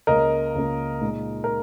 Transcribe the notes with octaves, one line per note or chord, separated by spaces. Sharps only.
C#2 C#3 A#3 A#4 D#5
C#2 C#3 A#3
A#2 G#3 D#4
A#4